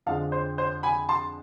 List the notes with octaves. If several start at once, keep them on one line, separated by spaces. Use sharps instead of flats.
F2 D3 F3 G#3 F5 A5
C5
C5
G#5 B5
A5 C6